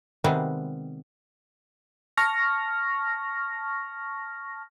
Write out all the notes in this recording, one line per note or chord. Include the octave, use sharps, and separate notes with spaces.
C3 D#3 G3 G#3 B3 C4
A5 C#6 F6 A#6